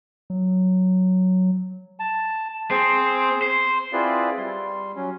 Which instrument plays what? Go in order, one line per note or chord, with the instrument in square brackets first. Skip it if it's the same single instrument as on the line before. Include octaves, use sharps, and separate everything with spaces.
[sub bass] F#3
[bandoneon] A5
[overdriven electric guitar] C4 [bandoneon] G#4 C5
[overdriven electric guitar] C5
[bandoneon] C4 E4 F4 G#4 B4 D5
G3 C6
F#3 C#4